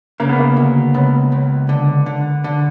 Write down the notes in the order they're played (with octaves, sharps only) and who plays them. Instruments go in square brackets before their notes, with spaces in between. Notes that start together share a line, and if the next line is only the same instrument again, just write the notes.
[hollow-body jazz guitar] C#3 [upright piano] A#3
[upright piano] B3
A#3
[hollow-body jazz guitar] D2
[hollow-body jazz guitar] C#2 [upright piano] B3
[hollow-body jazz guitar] C#2
D3
D3
D3